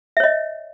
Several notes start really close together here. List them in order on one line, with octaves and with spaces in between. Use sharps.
E5 C#5 D#5